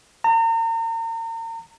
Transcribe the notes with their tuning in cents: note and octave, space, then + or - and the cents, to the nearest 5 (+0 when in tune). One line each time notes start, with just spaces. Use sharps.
A#5 -40